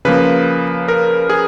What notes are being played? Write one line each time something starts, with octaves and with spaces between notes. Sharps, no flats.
C#3 F3 A#3 B4
A#4
G#4